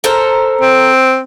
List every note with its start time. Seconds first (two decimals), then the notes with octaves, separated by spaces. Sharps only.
0.04 A4 A#4 C5
0.61 C4